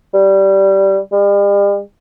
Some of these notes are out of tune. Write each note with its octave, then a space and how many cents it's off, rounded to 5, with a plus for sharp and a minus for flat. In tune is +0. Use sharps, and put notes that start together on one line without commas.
G3 -10
G3 +45